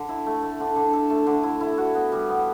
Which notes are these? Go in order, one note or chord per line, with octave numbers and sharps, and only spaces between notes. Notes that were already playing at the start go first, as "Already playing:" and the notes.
Already playing: D3
E4
A3
A3
D3
D3
A4
A3
D3
E4
E4
F#4
B3
G3
B3